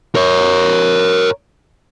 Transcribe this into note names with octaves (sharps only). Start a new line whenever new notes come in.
A#4 C#5